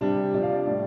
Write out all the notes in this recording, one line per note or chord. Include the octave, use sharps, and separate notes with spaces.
C3 G3 D4
C3 F3 D5
F5
D5
A2 G3 D5